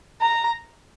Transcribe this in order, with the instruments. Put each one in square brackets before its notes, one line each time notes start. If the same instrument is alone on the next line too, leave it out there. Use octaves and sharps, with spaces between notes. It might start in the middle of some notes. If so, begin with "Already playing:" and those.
[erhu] A#5